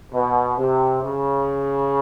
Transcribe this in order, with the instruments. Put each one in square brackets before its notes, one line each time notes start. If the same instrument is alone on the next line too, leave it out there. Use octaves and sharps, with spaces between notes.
[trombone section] B2
C3
C#3